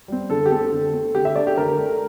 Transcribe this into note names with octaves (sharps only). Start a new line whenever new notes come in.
G3 C4
D3 A4
G4
A3 C4 A4
D3
A3 C4
D3 G4
E5
A3 D4 D5
G4
D3 A#4
A3 D4